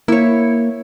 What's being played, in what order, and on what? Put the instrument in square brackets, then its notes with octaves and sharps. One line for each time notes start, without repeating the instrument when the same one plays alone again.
[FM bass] A#3 [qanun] E4 C#5